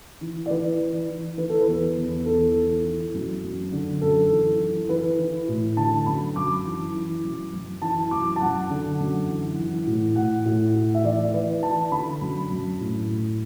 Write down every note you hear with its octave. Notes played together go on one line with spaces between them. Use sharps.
E3
D5
E3 B4
E3
E3
E3 B4
A4
B4
E2
E2
E3 A4
E3
E3
F#2
F#2
D3
F#2 A4
E3
E3
E3 B4
E3
A2
D3 A5
F#2 B5
F#2 D6
E3
E3
F#2
F#2
E3 A5
F#2 D6
A5
F#2 F#5
D3
F#2
E3
E3
A2
A2 F#5
A2
A2
E5
E3 D5
D5
E3 B4
E3 A5
D3 B5
F#2
F#2
A2
A2